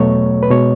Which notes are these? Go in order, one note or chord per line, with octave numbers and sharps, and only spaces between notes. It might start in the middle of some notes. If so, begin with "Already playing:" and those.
Already playing: E2 B2 F#3 A3 C#5
B4
B2 G#3 C#5